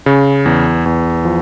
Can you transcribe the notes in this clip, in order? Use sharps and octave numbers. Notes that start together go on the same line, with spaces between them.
C#3
E2
E2
F3